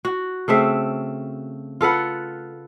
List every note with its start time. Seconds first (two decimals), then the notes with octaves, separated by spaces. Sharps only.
0.05 F#4
0.48 C#3 A3 C4 E5
1.81 F4 A4 B4 F#5